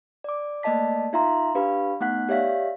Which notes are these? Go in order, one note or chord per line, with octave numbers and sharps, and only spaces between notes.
D5 D6
A3 A#3 D5 D#5 A5 B6
D#4 F4 E5 F5 A#5 C6
D4 G4 B4 F5 B5
A3 B3 D#4 F#5 F#6 B6
G4 C#5 D5 E5 F5 B6